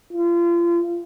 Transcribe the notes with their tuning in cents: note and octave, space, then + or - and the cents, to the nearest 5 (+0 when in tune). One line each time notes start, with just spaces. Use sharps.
F4 -35